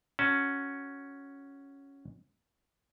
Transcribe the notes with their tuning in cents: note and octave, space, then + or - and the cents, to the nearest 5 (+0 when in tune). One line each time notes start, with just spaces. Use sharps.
C#4 +0 F#4 +0 A5 +0